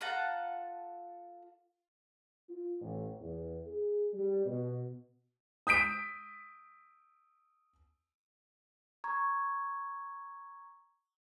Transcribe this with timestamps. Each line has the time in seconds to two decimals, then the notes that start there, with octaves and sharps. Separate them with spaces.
0.01 F4 A4 F#5 A#5
2.49 F4
2.81 A1
3.20 E2
3.66 G#4
4.12 G3
4.45 B2
5.67 D#6 G6 B6 D7
9.04 A#5 C#6 G#6